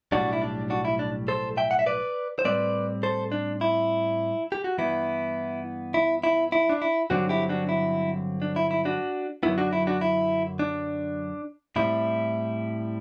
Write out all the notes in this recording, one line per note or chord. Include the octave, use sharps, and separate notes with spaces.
B1 A2 G3 D4 F#4
E4
D4
D4 F#4
E4
D4
A4 C5
E5 G5
F#5
E5
B4 D5
C5
A2 G3 C4 B4 D5
A4 C5
D4
E4
G4
F#4
G2 E3 B3 E4
E4
E4
E4
D4
E4
G2 D3 F#3 C4 D4 F#4
E4 G4
D4 F#4
E4
D4
E4
E4
D4 F#4
F#2 D3 F#3 B3 E4
D4 F#4
E4
D4 F#4
E4
D4
A2 G3 C4 E4